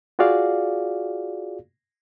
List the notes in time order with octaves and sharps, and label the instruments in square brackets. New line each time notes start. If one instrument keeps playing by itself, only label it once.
[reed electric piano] F4 F#4 G#4 D5 F5